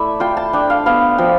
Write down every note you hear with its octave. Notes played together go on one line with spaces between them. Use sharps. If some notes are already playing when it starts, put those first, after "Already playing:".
Already playing: A3 E4 D5 E5
F4 G5
A5
D4 G5
F5
B3 F5
F3 G5